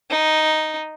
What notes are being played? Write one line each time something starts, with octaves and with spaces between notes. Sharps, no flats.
D#4